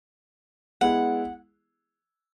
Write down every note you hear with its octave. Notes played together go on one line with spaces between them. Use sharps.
G#3 B3 E4 G#4 F#5